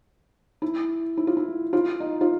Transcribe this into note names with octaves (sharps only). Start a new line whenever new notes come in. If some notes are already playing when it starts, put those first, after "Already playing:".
E4
E4
F4
E4
F4
D#4
F4